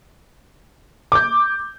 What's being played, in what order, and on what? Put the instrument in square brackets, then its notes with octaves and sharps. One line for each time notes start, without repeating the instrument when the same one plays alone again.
[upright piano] D6 G6